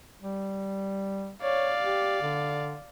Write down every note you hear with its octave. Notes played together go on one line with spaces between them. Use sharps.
G3
C#5 D5 F5
G4
D3